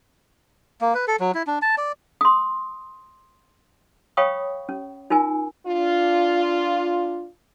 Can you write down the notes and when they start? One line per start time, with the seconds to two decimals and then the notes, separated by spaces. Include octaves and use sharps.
0.81 A#3
0.94 B4
1.08 A4
1.20 F#3
1.35 E4
1.47 D4
1.62 A5
1.78 D5
2.21 C6 D#6
4.17 C#5 F5 G5 B5 C#6 D#6
4.69 C#4
5.10 D#4 F4 A#4 G#5
5.67 D4 F4